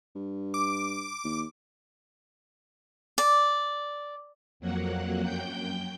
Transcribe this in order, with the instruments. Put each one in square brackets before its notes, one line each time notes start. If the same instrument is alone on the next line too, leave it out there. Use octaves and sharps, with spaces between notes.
[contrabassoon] G2
[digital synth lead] D6
[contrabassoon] D#2
[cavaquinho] D5
[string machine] F2 F#3 A#3 F#5
F#2 G5 G6